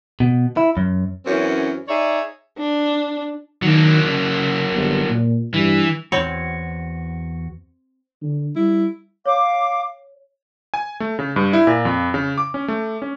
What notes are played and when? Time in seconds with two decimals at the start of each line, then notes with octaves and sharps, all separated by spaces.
0.20 B2
0.57 E4
0.77 F#2
1.26 F#2 E3 C4 C#4
1.88 D#4 G#4 C#5 D5 E5
2.58 D4
3.62 D#3 F#3 A#3
4.03 C#3
4.73 G1
5.09 A#2
5.54 G2 E3
6.12 E2 C4 F#4 C#5
8.22 D3
8.55 G3 E4
9.26 C#5 F5 D6
10.74 G#5
11.00 A3
11.19 C#3
11.36 G2
11.53 E4
11.67 A#2
11.85 F2
12.14 C#3
12.38 D6
12.54 C#4
12.68 A3
13.02 C#4